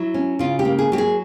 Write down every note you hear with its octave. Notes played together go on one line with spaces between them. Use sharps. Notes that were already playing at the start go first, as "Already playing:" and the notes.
Already playing: F#3 E4
C#4
C#3 F4
G4
A#3
G#4
F#3 G4
G#4